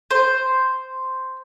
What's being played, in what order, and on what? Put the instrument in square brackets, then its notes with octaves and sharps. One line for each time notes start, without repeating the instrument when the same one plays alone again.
[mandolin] C5